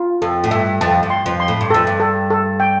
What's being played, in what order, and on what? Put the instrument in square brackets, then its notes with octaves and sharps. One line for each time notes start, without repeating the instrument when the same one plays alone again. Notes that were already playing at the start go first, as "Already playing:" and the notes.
Already playing: [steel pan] F4
[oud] F2 [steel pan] A4
[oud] A2
[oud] G2 [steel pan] E5
[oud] F2 [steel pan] A5
[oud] G2
[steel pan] C6
[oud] F2
[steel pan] C6
[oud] A2
G2
[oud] F2 [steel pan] A4
[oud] G2
[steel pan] A4
A4
G5